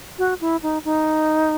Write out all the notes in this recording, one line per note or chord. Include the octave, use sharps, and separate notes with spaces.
F#4
E4
D#4
D#4